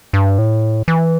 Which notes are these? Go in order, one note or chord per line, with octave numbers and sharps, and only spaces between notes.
G2
A2
E3